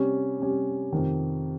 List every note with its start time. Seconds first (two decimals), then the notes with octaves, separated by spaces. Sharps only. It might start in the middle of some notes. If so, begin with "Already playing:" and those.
Already playing: C3 G3 C#4
0.40 C3 G3 C#4
0.93 F2 C3 D#3